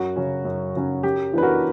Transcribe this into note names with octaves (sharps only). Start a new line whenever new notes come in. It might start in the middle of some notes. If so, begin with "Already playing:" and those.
Already playing: F#2 F#4
C#3 F#3 C#4
F#2
C#3 F#3 C#4
F#2 G4
E3 B3 D4 B4
F#4 A#4